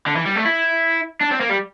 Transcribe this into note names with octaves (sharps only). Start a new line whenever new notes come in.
D3
E3
G3
A3
E4
D4
C4
A#3
G3